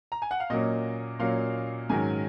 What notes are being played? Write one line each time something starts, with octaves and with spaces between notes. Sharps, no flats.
A#5
G#5
F#5
F5
A#2 F#3 A#3 C#4 D#5
A#2 F#3 A#3 C#4 F5
G#2 D#3 F#3 C#4 G#5